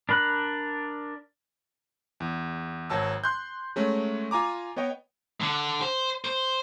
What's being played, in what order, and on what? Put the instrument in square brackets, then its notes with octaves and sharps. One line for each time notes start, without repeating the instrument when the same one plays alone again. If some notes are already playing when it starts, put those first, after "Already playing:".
[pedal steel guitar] D4 A#4 B5 F#6
[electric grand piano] E2
G#1 F#3 A5 E6
C6 F#6 G6
F#3 G#3 A3 C#4
F4 G#5 A#5 D6
B3 C#5 D#5 G5
[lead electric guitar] D3
C5
C5